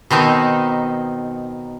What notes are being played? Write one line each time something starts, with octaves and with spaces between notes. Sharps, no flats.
B2 D#3 C4 D#4